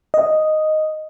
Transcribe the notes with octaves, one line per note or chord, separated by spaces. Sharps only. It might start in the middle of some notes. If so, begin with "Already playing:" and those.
D#5